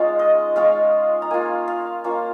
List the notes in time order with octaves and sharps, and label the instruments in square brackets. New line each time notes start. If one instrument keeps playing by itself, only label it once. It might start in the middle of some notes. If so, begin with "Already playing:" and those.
Already playing: [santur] G#3 C#4 D#4 F4 G#4
D#5
G#3 C#4 F4 F5
A#5
A#3 F4 G#5
F5
A#3 C#4 F4